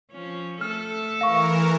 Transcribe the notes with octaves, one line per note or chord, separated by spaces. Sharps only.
F3 C#4
A3 A4 F6
E3 A#4 F5 C#6